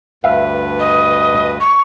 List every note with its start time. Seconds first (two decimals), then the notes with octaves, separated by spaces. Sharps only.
0.24 D2 G2 B4 E5 F5
0.79 D#5
1.60 C#6